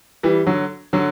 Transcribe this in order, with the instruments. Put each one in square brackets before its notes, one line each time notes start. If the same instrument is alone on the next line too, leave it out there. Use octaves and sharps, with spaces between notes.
[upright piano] E3 G3
D3 F#3
D3 F#3